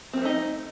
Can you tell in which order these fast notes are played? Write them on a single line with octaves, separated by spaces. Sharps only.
C4 A#3 A3 D#4